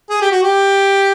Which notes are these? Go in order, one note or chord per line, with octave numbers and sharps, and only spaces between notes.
G#4
G4
F#4
G4